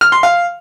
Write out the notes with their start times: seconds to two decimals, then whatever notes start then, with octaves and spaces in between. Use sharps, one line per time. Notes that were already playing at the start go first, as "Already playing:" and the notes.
0.01 F6
0.12 C6
0.23 F5